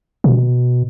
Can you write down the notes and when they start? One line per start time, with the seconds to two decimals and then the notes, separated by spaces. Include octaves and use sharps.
0.24 B2